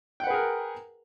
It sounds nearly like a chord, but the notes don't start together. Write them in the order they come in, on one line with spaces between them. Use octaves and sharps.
G5 F#5 B4 G#4 A#4